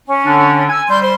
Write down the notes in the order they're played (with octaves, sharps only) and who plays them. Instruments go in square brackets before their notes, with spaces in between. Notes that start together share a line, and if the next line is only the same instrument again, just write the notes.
[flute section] C#4
[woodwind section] D3 D4
[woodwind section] G#5 [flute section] E6
[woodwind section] G3 [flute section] C6 G6
[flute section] C5 C6